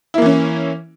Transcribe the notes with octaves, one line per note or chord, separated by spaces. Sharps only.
E3 A#3 C#4 E4